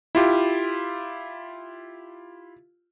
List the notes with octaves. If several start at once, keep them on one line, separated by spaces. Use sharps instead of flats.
E4 F4 G4